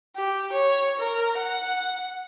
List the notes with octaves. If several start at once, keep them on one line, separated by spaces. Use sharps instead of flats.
G4
C#5
A#4
F#5